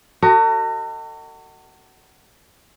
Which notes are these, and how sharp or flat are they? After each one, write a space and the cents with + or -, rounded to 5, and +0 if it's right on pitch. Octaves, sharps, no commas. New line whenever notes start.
F#4 +30 A4 +45 D#5 +0